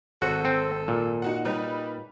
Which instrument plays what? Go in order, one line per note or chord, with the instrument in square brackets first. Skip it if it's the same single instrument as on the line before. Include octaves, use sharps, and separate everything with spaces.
[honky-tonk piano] G#1 C5 [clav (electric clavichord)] F#4 [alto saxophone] A4
[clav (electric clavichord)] C4
A#2
[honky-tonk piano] D#4 F#4 F#5
[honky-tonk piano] G3 B4 [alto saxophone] D#4